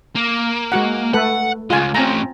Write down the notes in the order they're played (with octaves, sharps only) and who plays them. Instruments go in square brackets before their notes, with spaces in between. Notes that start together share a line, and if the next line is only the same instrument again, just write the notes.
[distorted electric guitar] A#3
[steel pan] G#3 F#4 F#5
[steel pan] A3 A4 B4 [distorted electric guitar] F#5
[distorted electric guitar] C#3 G#3 [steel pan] F4 G#5
[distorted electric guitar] A2 C#4 [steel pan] C4 G#5 A#5